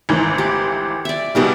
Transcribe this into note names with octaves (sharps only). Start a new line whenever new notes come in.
G#1 D2 E3
G4
D5 E5
B2 G3 B3 G4 G#4